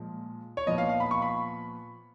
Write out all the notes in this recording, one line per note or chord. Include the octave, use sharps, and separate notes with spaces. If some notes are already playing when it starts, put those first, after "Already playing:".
Already playing: A#2 F3 G#3
C#5
A#2 F3 B3 D#5
F5
F5
B5
C#6
B5